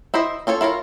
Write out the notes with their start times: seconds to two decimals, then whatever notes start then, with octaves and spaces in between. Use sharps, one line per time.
0.14 E4 C5 D#5 E5
0.47 C#4 F4 A4 C#5
0.61 E4 F4 A#4 C#5